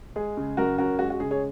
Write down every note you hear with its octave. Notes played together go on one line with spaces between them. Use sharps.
G#3 G#4
C#3
F#2 F#4 A#4
C#4 F#4 A#4
G#3 F#4
F#4
C#3 G#4
G#4 C#5